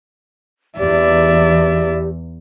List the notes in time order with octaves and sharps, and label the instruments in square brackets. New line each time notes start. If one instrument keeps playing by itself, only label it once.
[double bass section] E2 [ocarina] G4 [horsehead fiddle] D5 E5